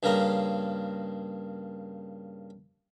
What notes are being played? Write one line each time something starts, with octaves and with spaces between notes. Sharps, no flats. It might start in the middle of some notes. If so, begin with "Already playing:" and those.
G2 C#3 A#3 A#5